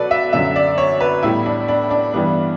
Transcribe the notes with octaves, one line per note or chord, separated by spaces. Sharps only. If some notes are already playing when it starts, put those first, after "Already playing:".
Already playing: B2 F#3 A4 B4 D5
E5
F#2 D3 F#3 E5
D5
C#5
B4
A2 G3 B3 E4
D4
D4
D4
G2 E3 G3 B3 D4